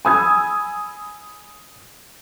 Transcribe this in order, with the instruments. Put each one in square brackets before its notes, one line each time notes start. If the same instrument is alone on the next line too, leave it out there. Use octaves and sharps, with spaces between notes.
[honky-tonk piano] G#5 B5 D#6 E6 G#6